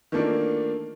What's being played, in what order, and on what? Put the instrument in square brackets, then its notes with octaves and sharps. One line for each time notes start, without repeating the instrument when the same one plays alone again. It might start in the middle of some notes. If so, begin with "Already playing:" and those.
[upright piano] D#3 E3 A3 A#3 D4 F4